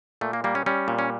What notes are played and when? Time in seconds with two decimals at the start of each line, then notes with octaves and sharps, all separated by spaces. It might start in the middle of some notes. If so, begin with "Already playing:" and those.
0.21 A#2 A3
0.33 A#3
0.44 G3 A#3
0.55 C#4
0.66 G3 C#4
0.88 A#2
0.99 C#4